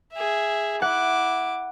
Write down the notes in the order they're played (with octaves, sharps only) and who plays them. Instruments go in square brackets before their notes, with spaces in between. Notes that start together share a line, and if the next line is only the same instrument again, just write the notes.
[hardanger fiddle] G#4 E5
[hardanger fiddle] E4 D6 [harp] F#5